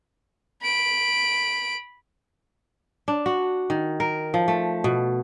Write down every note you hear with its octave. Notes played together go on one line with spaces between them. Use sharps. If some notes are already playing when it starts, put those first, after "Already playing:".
B5 D7
D4
F#4
D#3
A#4
F3
A3
B2